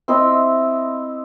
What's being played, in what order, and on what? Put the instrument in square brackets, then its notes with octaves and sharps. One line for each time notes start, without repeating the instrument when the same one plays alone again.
[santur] C4 E4 D#5